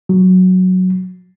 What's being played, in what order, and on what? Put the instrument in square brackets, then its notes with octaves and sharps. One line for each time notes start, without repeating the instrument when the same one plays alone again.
[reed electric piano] F#3